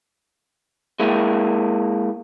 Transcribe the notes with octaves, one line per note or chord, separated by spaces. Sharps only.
G#3 A#3 E4